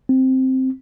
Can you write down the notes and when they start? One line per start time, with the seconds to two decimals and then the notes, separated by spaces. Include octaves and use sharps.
0.09 C4